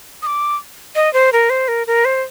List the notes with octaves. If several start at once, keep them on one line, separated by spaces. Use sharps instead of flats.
D#6
D6
D#5
C5
A#4
C5
A#4
A#4
C5